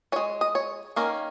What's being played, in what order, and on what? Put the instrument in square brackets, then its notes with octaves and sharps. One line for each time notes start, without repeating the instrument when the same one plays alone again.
[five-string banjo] C#4 C#5
G#3
D#5
C#5
D#3 A#3 C#4 A#4